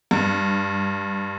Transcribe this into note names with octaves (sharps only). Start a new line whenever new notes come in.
G2